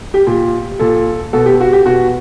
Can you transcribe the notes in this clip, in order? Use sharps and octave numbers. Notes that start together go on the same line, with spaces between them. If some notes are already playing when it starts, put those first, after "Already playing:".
G4
A#2 G4
A#2 A4
B2 A4
G4
F#4
G4
B2 F#4